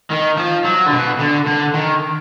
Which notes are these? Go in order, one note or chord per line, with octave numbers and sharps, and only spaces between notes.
D#3
F3
F#3
D3
B2
D3
D3
D#3